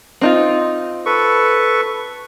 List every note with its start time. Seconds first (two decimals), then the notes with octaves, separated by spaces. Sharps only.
0.21 C4 D#4 F4
1.06 A4 B4 C#6